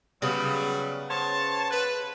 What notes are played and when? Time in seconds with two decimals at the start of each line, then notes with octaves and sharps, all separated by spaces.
0.22 C#3 F#3 G3 B3
1.11 C5 C#5 A5
1.71 B4